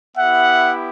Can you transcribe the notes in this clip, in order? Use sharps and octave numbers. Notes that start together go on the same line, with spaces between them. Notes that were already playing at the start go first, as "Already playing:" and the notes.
B3 E4 G4 E5 F#5